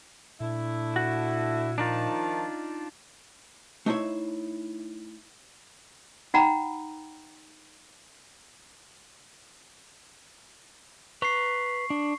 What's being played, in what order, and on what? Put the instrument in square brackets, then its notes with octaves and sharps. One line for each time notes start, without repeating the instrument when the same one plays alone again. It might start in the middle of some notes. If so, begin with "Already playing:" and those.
[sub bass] A#2 [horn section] A3 D4 E4
[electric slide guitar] F#4
[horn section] D#3 F3 A5 [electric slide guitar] D4 D#4 F4
[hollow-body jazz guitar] A3 D#4 E4 C5 C#5 E5
[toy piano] D#4 F#5 G5 A#5 B5
[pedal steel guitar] B4 A#5 [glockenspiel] C#6 C7
[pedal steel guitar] D4